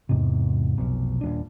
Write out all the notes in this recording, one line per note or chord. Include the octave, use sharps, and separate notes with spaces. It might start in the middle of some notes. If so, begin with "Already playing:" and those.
E2 G#2 C3
F1 B1
D#1 D4